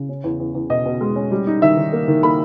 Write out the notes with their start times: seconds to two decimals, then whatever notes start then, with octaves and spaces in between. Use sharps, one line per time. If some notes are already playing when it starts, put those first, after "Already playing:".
Already playing: C#3
0.09 C#4
0.24 E2
0.40 E2
0.55 E2
0.70 B2 D#5
0.86 B2
1.01 G#3
1.16 C#4
1.31 G3
1.47 D#4
1.62 D#3 E5
1.77 D#3
1.93 A#3
2.08 D#3
2.23 A#3 B5